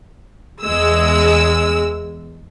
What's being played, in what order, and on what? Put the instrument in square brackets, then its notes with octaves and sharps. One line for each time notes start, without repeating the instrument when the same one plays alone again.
[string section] E2 G#3 E6